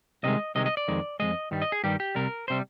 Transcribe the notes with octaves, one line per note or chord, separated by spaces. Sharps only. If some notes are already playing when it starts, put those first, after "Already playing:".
C2 C3 D#3 G#3 D#5
C2 C3 D#3 G#3 D#5
D#5
D5
F2 D#3 G#3
F2 D#3 G#3 D#5
G2 D#3 G3
D#5
G#4
G2 D#3 G3 G4
G4
C2 C3 G3 A#4
C3 G3 C5